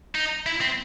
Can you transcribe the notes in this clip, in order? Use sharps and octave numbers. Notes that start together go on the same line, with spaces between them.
D#4
E4
C4